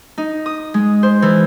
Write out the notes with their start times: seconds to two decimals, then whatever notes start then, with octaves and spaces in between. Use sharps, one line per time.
0.18 D#4
0.46 D#6
0.74 G#3
1.03 C5
1.22 E3